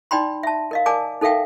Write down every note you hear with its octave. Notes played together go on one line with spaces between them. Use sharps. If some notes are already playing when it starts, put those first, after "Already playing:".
D#4 D5 G5 B5 C6
E5 A5
A#4 D#5 F5
A#4 D5 G#5 A5 D6
D#4 A4 A#4 E5 F5 G5